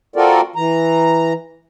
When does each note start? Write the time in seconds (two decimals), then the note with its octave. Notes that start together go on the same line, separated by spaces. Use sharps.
0.16 C4 F4 F#4 A4 A#4 D5
0.56 E3 A#5